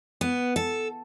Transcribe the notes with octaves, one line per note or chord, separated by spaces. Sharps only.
B3
A4